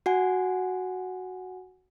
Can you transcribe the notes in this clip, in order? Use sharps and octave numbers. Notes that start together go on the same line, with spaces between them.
F#4 F#5 G#5